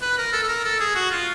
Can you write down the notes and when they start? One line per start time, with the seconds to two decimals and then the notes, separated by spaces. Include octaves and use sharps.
0.02 B4
0.18 A#4
0.33 A4
0.43 A4
0.49 A#4
0.65 A4
0.80 G#4
0.95 F#4
1.11 F4